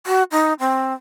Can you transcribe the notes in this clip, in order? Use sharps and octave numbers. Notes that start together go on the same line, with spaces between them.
F#4
D#4
C4